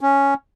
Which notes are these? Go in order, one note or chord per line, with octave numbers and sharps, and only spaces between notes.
C#4